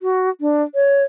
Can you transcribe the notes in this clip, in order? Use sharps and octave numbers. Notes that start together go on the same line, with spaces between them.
F#4
D4
C#5